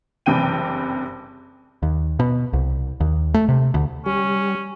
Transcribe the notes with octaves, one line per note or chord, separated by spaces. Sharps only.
F#1 G2 C3 E3 G5 D#7
D#2
B2
C2
D#2
A3
C3
D2
G3 C#4